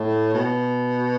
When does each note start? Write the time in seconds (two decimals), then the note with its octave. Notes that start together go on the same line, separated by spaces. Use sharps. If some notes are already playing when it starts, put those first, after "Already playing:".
Already playing: A2
0.34 B2